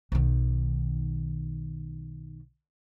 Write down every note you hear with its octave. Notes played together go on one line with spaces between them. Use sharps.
B1 D#3